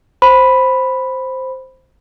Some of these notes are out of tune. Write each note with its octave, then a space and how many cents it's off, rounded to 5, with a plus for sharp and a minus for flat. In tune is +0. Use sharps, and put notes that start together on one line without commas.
C5 +0 B5 +0